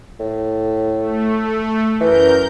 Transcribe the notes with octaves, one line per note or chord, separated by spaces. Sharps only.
A2
A3
F#2 E3 A#4 G6